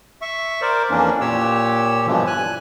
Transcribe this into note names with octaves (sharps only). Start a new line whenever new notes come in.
E5 C#6
A#4 C5 D5
F2 E3 A#3 C#4 D4
A#2 G4 C#5 E6
G2 B2 D3 E3 F3
G#5 F#6